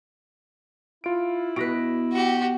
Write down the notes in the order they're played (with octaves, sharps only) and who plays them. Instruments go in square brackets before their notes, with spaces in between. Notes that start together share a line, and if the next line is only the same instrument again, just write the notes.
[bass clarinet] E4 [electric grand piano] F4 D7
[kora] B2 B4 [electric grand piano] A#6 D7
[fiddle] F#4 G4